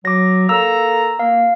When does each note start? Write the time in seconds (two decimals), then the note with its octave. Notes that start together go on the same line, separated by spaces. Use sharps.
0.05 F#3 D6 A#6
0.49 A#3 A4 A#5 E6
1.19 A#3 F5